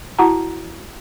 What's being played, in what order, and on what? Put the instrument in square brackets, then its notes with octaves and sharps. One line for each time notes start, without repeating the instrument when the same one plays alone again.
[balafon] E4 F#4 F#5 A5 A#5